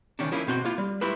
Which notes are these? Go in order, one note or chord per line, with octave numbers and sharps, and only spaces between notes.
C#2 D#3 C#4 D4
F3 A#3 C#4 D4 E4
B2 C4 F#4 C6
A#3 E4 F4
G3
A3 E4 F4 G4 B4 E5